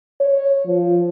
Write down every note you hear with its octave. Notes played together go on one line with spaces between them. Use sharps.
C#5
F3